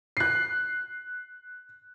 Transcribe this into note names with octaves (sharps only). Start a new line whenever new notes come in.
F#6 C7